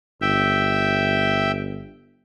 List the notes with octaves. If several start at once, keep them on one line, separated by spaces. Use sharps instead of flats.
G1 E5 G5